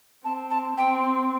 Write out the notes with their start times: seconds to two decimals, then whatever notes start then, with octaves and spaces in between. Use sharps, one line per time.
0.25 C4 A5
0.50 A5
0.77 C4 G5